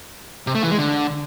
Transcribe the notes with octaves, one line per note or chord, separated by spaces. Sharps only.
C3
A3
E3
G#3
D3